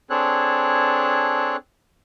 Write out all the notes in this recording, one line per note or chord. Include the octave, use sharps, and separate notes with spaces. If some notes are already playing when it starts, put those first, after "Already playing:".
C4 D4 G#4 A4 C#5 F#6